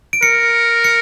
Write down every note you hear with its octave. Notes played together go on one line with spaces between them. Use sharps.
D7
A#4 C#7
C#7